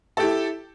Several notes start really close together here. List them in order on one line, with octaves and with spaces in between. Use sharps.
A4 G4 E4